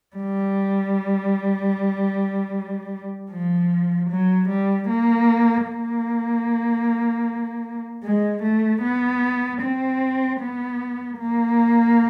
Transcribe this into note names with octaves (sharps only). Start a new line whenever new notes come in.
G3
F3
F#3
G3
A#3
A#3
G#3
A3
B3
C4
B3
A#3